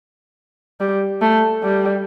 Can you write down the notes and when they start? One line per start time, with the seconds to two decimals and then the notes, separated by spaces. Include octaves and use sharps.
0.80 G3
1.21 A3
1.63 G3